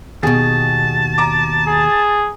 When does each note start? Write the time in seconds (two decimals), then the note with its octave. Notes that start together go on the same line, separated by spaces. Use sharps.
0.23 D#2 B2 G#4 A5
1.18 A#5 D6
1.67 G#4